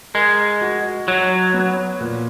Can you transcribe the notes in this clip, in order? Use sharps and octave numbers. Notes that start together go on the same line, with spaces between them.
G#3 A#4
F#4
F#3 F#4
B3
A#2